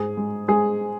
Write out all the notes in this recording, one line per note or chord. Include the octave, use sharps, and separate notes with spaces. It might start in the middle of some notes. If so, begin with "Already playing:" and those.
Already playing: G#2 G#4
G#3
G#3 G#4